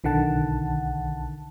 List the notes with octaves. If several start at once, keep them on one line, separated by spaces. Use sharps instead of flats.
B1 D3 D#3 F#5 A5